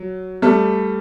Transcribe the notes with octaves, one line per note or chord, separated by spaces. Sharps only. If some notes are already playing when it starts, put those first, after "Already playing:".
Already playing: F#3
G3 A3